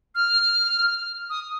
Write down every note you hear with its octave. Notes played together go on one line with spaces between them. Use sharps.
F6
D#6